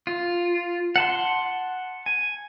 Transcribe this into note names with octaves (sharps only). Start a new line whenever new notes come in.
F4
F#5 A5 C6
G#5